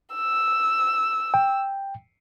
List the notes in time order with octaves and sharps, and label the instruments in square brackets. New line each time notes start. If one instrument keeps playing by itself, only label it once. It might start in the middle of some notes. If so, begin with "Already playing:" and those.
[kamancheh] E6
[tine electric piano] G5